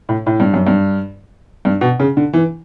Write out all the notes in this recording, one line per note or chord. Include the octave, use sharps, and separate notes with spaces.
A2
A2
G2
F#2
G2
G2
B2
C#3
D3
E3